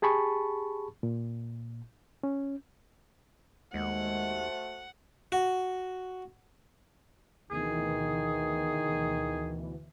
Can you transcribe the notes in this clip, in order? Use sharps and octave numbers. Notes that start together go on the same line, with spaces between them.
G4 G#4 A5 B5 C#6
A#2
C#4
D#2 G#3 A3 F#4 C5 F#5
F#4
D2 B2 D#3 E3 G#4